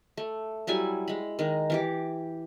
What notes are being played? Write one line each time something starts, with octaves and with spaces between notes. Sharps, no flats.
A3
F#3 G3 E4 G#5
G#3 B5
D#3 G#3 D#4
E3 G4 D6